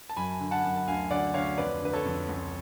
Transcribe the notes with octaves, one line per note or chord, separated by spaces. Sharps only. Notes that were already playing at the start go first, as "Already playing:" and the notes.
A5
F#2 G#5 B5
D3
F#5 A5
F#2
A5
D2 F5 G#5
D3 D5 F#5
D2 C#5 F5
F2 B4 D5
D3 B4
A4 C#5
F2
C#2